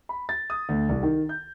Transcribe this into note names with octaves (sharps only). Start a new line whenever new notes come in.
B5
A6
D#6
D2
C2
D#3
G6